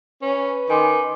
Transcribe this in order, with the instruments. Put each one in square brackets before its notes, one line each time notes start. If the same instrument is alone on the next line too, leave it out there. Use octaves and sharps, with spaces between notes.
[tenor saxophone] C#4 [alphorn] B4
[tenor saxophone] D#3 [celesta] G#5 C6 D6